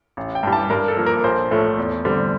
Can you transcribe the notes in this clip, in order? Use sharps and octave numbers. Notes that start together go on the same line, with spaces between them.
A1
G5
G2 E3 G3
A5
G2 A#4
A4
F3 A#3
A#4
A#1 C5
A2 F3 A3
E2
D3 G3 C4